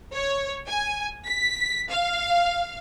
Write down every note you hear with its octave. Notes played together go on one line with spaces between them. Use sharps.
C#5
G#5
B6
F5